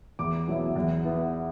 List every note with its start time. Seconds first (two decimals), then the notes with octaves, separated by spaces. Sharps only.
0.19 E2 D6
0.48 B2 F#3 B3 E4
0.75 E2
1.04 E3 B3